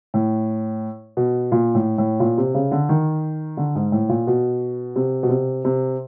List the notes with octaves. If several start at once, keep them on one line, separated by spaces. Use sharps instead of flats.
A2
B2
A#2
A2
A2
A#2
C3
C#3
D3
D#3
D3
G#2
A2
A#2
B2
C3
B2
C3
C3